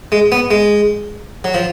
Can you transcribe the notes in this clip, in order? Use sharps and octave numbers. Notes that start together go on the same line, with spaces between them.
G#3
B3
G#3
F#3
F3